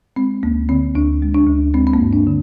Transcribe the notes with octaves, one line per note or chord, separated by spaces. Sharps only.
G#3 C4
D2 A#3
D3 C4
D2 D4
G#3
D4
D2
G#3 C4
C4
A#3
G2
D4
D3